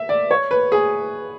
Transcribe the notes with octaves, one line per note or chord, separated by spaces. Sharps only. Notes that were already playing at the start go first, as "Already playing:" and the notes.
Already playing: E5
D5
C#5
B4
G#4